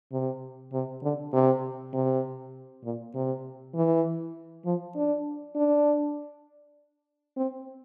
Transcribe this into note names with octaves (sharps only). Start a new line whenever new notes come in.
C3
C3
D3
C3
C3
A#2
C3
E3
F3
D4
D4
C4